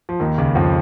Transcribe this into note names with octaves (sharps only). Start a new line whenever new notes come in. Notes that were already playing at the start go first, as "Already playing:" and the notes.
F3
D#2 D#3
C#2 C#3
F2 F3